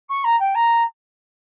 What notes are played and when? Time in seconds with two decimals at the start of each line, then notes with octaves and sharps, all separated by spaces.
0.09 C#6
0.24 A#5
0.40 G5
0.55 A#5